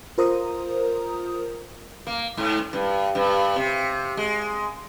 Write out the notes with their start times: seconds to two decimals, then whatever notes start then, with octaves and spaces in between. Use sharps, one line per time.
0.18 F4 A#4 C5 A#5 D#6
2.07 A#3
2.37 G#2
2.73 G2
3.15 G2
3.56 C3
4.17 G#3